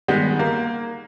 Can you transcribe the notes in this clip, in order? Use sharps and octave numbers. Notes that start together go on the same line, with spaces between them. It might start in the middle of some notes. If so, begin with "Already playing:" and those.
D#3 G3 G#3 B3
A#3